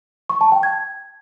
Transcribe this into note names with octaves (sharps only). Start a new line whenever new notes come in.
C#6
A5
G5
G#6